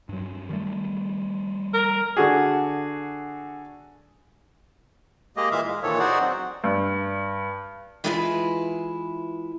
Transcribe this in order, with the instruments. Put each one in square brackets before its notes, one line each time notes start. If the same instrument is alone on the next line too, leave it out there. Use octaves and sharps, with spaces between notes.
[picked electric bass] G2 F#3
D#3 G3 A3
[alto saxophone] A#4
[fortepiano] D3 F#4 G#4
[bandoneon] G#3 A#3 G4 G#4 D#5
A#2 E3 G#3 E5 F5
G#3
A#2 D#3 E3 A4 C#5
D#4 F#4 G#4 C5 D5 F#5
F#3 C4
[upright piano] G2
[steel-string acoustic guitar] E3 G#3 E4 F4 G#4 B4